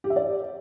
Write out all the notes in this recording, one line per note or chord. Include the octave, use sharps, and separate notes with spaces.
G4
E5
D5